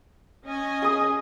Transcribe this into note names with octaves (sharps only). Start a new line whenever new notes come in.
C#4 D#5 G#5
G#4 D#6